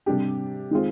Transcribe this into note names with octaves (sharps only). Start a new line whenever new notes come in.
C3 G3 D4 G4
D#3 G#3 C4 F4